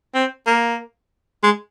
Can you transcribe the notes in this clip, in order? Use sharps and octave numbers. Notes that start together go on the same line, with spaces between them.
C4
A#3
G#3